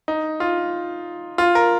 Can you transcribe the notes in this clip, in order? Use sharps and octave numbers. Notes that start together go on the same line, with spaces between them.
D#4
F4
F4
A#4